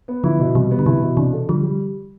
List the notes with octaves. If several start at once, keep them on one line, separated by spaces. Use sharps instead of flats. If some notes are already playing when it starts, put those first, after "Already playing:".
B3
D3 F3 E4
B2
C3 E3 G3
B3
D3
C3 E3 E4
B2
C3 E3 D4
A4
D3 F3 G3
G3